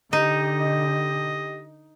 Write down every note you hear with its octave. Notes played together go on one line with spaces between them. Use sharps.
D3 D#4 G4 D#5